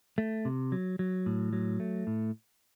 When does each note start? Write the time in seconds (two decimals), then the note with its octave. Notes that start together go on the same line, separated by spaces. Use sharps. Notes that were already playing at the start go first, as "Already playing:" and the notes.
0.18 A3
0.45 C3
0.72 F#3
0.99 F#3
1.26 A2
1.53 F#3
1.80 A3
2.07 A2